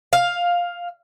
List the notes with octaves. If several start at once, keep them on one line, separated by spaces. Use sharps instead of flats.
F5